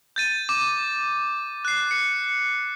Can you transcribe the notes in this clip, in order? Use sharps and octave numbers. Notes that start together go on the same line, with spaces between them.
G6 A6 D#7
D6
F#6 C7
C#7